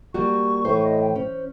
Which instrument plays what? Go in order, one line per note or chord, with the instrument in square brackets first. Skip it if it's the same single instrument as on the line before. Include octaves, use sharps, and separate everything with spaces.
[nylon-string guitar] G3 A#3 F#4 [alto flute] C#6
[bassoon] A2 [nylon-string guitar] E3 C5
[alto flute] D#5
G5
[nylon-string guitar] C#4 [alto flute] C5